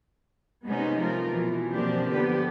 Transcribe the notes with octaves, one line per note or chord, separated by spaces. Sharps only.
C3 G#3 B3 C#4 D#4
F3 A3 F4 A#4
B2 E3 F3
B2 F3 A#3 C4 D4 G4
D3 F3 B3 G4 B4